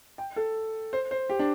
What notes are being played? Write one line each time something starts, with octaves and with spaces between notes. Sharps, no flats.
G5
A4
C5
C5
G4
D4